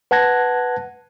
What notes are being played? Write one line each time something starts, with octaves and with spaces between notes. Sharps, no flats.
B4 F#5 A5 F#6 G#6 A#6